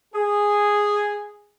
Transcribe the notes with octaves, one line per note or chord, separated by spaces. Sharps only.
G#4